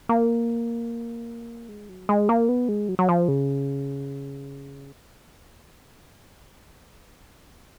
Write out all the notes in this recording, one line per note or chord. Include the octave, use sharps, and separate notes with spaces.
A#3
G#3
F#3
G#3
A#3
B3
G#3
F#3
F#3
F3
C#3